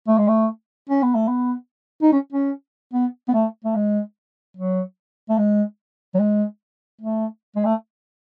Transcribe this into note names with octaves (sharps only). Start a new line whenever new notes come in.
A3
G#3
A3
C#4
B3
A3
B3
D#4
C#4
C#4
B3
B3
A3
A3
G#3
F#3
A3
G#3
F#3
G#3
A3
G#3
A3